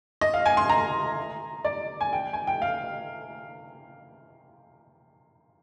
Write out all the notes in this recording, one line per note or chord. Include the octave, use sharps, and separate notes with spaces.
D#5
F5
G#5
C6
A#5
D5
G#5
G5
G#5
G5
F5